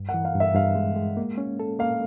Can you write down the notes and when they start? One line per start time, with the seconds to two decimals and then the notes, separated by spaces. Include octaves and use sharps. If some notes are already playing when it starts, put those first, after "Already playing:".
Already playing: G2
0.09 F#5
0.14 E3
0.25 F5
0.35 G2
0.40 E5
0.55 G2 F5
0.75 G#3
0.96 G#3
1.17 A#3
1.38 C#4
1.60 A4
1.79 A#3 F5